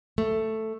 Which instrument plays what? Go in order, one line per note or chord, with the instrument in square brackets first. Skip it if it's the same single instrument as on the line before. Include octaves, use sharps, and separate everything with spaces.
[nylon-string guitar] A3